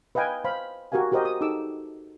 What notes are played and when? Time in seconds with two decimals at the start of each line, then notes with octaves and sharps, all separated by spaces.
0.15 B4 D#5 F5 G5 G#5
0.44 C5 F5 B5
0.92 F#4 G4 A#4 F5 G#5
1.11 F#4 G4 A#4 C5 D#5
1.25 D#6
1.41 D#4 G4 A4 D6 E6